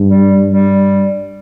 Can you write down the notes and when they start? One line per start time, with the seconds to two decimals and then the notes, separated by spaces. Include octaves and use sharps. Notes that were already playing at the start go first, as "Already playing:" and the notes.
Already playing: G2
0.09 G3
0.50 G3